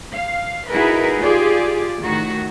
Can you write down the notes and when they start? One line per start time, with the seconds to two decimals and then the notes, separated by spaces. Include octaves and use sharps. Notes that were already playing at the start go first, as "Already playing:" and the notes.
0.15 F5
0.70 D#4 E4 F#4 G#4 A#4 B4
1.20 F4 G4 G#4 D5
2.03 A2 D#3 F#4